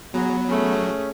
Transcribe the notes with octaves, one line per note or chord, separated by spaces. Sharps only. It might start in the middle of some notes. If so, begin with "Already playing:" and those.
F#3 B3 F#4 G#4 A#5
A3 C#4 G#4